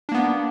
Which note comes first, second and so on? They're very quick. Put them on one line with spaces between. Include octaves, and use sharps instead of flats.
D4 A#3 B3